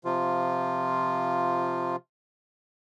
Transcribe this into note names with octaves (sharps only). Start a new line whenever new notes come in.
C3 F3 F4